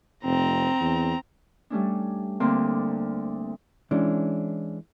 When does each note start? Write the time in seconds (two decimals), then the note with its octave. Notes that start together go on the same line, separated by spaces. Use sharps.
0.25 F1 C4 A#5
0.81 E2
1.70 G3 A3 C#4 D4
2.40 D2 D3 A#3 C4 C6 D6
3.91 E3 G#3 C#4 D4